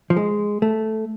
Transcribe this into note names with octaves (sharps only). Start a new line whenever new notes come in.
F3
G#3
A3